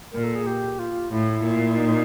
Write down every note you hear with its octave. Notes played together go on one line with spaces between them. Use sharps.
A#2 A#4
A4
G#4
G4
F4
A2 E4
A#2
D#4